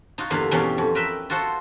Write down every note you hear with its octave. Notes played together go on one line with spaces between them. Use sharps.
D#4 F4 F#4
E2 G2 D3 A#3 F5 B5
E2 B2 C#4 G4 F5
F2
A#4 B4 E5 G5
F4 F#4 A4 C5 F#5